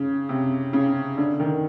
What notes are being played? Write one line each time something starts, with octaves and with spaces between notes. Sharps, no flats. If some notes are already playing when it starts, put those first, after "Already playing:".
Already playing: C#3
C3
C#3
D3
D#3